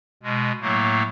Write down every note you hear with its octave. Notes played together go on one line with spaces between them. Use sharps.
B2 G#3
A2 F#3 A3 A#3